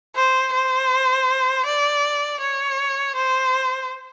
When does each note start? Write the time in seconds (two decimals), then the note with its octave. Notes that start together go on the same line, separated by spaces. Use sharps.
0.16 C5
0.53 C5
1.66 D5
2.41 C#5
3.16 C5